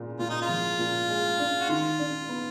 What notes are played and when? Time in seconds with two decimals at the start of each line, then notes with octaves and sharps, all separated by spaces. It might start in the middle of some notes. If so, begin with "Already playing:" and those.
Already playing: A#2 G#3
0.19 A#2 F4
0.30 D#4
0.42 F4
0.49 F3
0.79 A#2
1.09 G#3
1.39 D4
1.60 F#4
1.69 D#3 F4
1.99 D4
2.29 B3